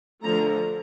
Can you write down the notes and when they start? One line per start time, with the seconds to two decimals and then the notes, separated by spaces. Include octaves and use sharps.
0.23 D3 F3 A3 A#5